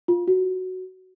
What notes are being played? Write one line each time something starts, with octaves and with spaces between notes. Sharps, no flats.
F4
F#4